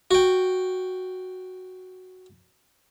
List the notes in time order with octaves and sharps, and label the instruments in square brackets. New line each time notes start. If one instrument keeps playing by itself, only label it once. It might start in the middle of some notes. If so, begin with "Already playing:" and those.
[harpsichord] F#4 G5